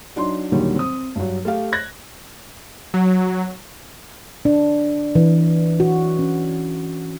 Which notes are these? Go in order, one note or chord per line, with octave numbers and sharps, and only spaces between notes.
F#3 D4 D#4 C6
D#2 A#2 D3 D#3 F#3 G3
C4 D#6
G2 F#3
A3 G4 F5
F#6 G#6 A#6
F#3
D4
E3
F#4
C#4